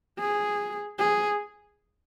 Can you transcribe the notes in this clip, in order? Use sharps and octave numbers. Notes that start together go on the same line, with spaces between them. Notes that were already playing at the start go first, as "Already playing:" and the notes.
G#4
G#4